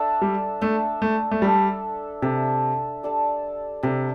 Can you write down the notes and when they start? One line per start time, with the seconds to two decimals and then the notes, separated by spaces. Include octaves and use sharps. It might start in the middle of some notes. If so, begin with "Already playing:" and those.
Already playing: D4 A4 E5
0.22 G3
0.61 A3 D4 A4 E5
1.02 A3
1.31 A3
1.42 G3 D4 A4 E5
2.22 C3 D4 A4 E5
3.03 G3 D4 A4
3.83 C3 G3 D4 A4